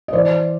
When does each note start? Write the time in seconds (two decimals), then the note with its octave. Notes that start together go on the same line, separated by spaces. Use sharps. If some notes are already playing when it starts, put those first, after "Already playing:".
0.08 D#5
0.13 E3 C5 D5